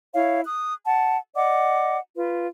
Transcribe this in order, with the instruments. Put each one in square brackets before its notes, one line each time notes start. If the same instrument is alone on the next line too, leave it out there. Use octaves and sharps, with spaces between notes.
[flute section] E4 C#5 F5
D#6 F#6
F#5 A5
D5 D#5 F#5 D6
F4 B4